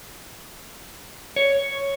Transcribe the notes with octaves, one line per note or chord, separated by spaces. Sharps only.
C#5